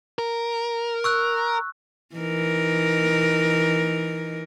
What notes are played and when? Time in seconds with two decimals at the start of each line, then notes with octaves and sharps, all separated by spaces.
0.19 A#4
1.04 C#6 E6 F#6
2.16 E3 D#4 A#4